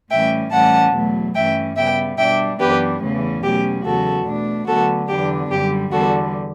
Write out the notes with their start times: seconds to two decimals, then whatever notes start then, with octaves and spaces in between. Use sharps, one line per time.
0.11 A2 E3 G3 C#4 E5 G5
0.52 A2 E3 G3 C#4 F#5 A5
0.93 E2 B2 F#3 A3
1.35 G2 E3 A3 C#4 E5 G5
1.77 C#3 G3 B3 E5 G5
2.18 B2 G3 D4 E5 G5
2.60 F#2 E3 B3 D4 G4 B4
3.01 E2 C#3 E3 A3 C#4
3.44 B2 F#3 A3 C#4 G4
3.85 E2 C#3 F#3 F#4 A4
4.26 B2 A3 D4
4.67 D2 D3 F#3 B3 F#4 A4
5.09 E2 D3 F#3 B3 D4 G4
5.50 F#2 D3 G3 G4
5.92 E2 D3 G3 B3 F#4 A4